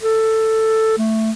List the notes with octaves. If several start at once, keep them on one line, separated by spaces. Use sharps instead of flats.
A4
A3